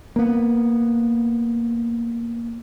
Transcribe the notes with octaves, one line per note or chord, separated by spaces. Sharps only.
A#3 B3